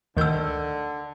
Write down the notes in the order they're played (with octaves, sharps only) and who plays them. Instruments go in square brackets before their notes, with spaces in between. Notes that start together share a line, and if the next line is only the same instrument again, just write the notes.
[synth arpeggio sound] D2 D#3 G6 [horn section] D3 [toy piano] D#5 E6